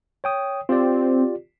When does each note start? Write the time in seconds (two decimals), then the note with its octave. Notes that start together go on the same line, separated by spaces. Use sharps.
0.24 C#5 G5 D#6
0.69 C4 F4 G4 D5